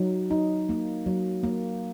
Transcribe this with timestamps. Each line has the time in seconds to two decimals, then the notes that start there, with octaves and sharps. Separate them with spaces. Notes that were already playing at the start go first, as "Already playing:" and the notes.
Already playing: F#3 D#4
0.31 D#4
0.69 A#3
1.06 F#3
1.43 A#3